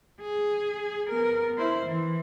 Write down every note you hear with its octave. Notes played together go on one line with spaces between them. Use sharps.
G#4
B3 A#4
E4 C5
E3